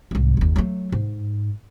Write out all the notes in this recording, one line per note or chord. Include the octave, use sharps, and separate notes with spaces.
C2 G#2
F#1 D#2
F#3 A3
G#2